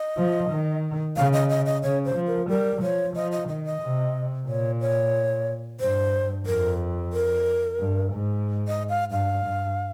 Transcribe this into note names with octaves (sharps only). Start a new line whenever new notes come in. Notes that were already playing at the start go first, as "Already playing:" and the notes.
Already playing: D#5
F3
D#3
C#3 F5
D#5
D#5
D#5
C#3 C#5
C5
F3
A#4
G3 A#4
F3 C#5
F3 D#5
D#5
D#3 D#5
D#5
C3
A#2 C#5
C#5
G2 C5
F2 A#4
A#4
G2
G#2
D#5
F5
G2 F5
G2